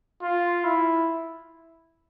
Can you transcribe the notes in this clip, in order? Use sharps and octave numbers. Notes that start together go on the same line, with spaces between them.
F4
E4